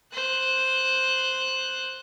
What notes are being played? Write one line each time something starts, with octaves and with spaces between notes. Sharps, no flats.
C5 F#6